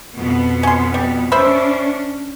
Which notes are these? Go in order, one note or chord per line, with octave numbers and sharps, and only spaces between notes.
F2 B2 B3
C#4 C6
G3
C#4 D4 C5 E5 B5